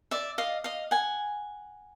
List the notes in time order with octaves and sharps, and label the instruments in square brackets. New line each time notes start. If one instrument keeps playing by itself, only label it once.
[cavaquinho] D5 E5
D#5 F5
D#5 F5
F#5 G#5